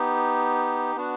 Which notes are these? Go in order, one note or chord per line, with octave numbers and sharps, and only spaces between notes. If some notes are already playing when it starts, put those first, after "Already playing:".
Already playing: B3 D#4 G4
B3 D4 F#4